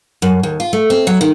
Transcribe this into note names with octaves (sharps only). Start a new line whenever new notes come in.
F#2
D#2
F4
A3
C4
F#3
D#3